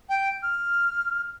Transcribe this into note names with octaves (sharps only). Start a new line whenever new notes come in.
G5
F6